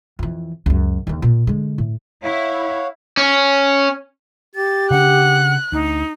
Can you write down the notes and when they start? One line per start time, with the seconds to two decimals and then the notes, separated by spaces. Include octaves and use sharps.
0.19 F2 E3
0.66 C#2 F#2
1.07 D#2 D3
1.22 A#2
1.47 D3 G#3
1.78 A2
2.24 E4 C#5 F5 F#5
3.17 C#4
4.55 G4 A6
4.90 C#3 D4 F#5 F#6
5.72 D2 D#4